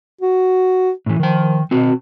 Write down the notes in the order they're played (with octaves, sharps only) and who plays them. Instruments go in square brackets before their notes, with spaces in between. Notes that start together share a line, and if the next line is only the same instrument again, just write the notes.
[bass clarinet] F#4
[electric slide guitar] A2 E3
[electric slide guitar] D#3 G5 [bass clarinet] F3
[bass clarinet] B2 [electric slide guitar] C4 F#4